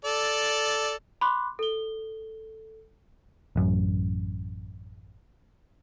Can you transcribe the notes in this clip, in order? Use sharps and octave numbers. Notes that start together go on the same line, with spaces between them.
A4 D5
B5 C6 D6 F#6
A4 G7
A1 F#2